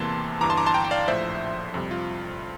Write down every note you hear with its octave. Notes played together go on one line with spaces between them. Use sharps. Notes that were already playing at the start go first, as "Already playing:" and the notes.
Already playing: E2 C3 E3 A#3 A5 C6
G1 G2 E3 A#5 D6
A5 C6
A#5 D6
A5 C6
G5 A#5
G5
D5 F5
A#1 A2 F3 C5 E5
F2 C3 G3
F4